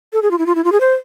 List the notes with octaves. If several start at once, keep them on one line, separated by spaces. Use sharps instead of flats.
A4
G#4
F4
E4
F4
E4
F4
G#4
C5